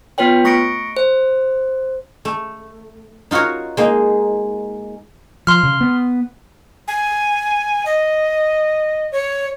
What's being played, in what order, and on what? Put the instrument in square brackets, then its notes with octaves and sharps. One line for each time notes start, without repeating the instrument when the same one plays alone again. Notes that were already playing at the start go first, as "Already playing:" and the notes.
[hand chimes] B3 F4 B4 C#5 G5
A3 C#6 A#6 C#7 D7
C5
[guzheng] A3
D#4 F4 F#4 A#4 C#5
G#3 A#3 D#4
[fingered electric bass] F3 [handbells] C6 F6
[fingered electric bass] C#3
B3
[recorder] G#5
D#5
C#5